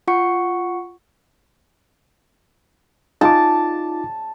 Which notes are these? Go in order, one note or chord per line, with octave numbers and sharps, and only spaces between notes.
F4 F#5 C#6 C#7
D#4 F4 A5 D6